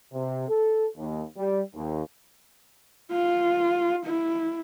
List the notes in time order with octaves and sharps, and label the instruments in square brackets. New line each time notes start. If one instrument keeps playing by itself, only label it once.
[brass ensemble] C3
A4
D#2
G3
D#2
[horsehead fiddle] F4
E4